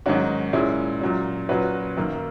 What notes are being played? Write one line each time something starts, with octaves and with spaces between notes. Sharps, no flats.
G#2 D#3 F#3 C#4 F#4
A#2 G#3 C#4 E4
A#2 F#3 C#4
A#2 F#3 C#4 F#4 B4
F#2 D#3 A#3